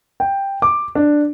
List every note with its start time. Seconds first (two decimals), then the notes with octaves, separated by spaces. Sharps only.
0.20 G5
0.62 D6
0.95 D4